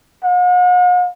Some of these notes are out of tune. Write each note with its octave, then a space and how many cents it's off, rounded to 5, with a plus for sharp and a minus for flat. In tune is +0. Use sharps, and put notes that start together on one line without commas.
F#5 -45